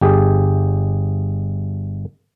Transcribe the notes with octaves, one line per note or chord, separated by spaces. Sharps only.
G1 G4 G#4